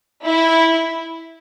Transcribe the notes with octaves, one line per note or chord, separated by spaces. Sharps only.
E4